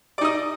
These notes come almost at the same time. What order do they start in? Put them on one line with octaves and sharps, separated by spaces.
D5 D#4 D#5